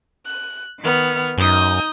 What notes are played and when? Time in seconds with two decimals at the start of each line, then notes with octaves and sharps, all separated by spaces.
0.24 F#6
0.81 D#3 B3 F6
1.38 F#2 D#4 D#6 G6